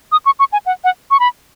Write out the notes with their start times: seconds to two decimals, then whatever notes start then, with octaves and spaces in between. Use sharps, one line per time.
0.12 D#6
0.26 C#6
0.39 C#6
0.53 G#5
0.66 F#5
0.84 F#5
1.11 C#6
1.20 B5